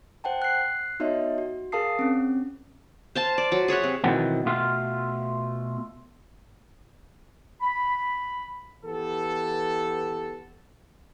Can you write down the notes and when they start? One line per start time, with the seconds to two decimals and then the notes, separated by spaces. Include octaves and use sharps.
0.24 C5 F#5 G5 A5
0.42 F#6 C7
1.00 B3 D#4 F#4 C#5 D#5 E5
1.38 F#4
1.72 G#4 A#4 F5 A5 D#6 C7
1.99 C4 C#4
3.15 C5 F5 A5
3.38 D5
3.52 F#3
3.68 G#4 C#5 E5 F#5
3.83 C3
4.04 B2 D#3 E3 F#3 B3 C4
4.46 B2 A3 F4
7.61 B5
8.85 E3 B3 G4 A4